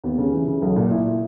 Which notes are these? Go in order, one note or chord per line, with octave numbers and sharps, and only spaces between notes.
D#2 B3
C#3 C#4
E3
C#3
B1
A#2
A#2 E4